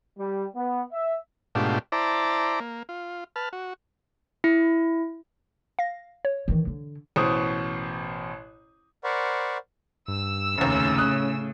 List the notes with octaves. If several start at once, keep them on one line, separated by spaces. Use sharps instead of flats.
G3
B3
E5
G#2 B2 A3 D4 F4 G4
E4 C5 D5 A5 A#5 D6
A#3
F4
B4 A5 F6
F#4
E4
F5 A#6
C#5
D#3 E3
D3
A1 B2 C5 D#6
A#4 C5 D5 F#5 B5 C#6
G2 E6
F1 D#2 A2 C#3 C#4
D#6 F#6